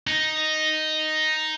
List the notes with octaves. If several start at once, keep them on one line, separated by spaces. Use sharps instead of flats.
D#4